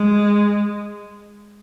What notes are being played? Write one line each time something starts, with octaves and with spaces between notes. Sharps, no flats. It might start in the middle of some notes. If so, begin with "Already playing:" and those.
Already playing: G#3